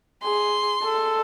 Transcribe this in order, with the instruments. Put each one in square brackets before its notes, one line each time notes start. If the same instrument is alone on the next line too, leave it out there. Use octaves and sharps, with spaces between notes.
[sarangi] G#4 [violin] C6
[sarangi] A4